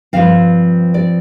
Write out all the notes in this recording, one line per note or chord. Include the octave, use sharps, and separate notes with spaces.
G2 F3 C4 F5
D5